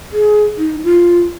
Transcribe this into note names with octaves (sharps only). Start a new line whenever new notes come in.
G#4
D#4
F4